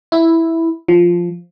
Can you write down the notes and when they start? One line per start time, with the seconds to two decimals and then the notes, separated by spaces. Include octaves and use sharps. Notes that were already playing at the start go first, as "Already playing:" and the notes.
0.12 E4
0.88 F3